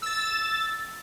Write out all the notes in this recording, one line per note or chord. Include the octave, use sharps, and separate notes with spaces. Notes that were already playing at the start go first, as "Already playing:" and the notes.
E6 A6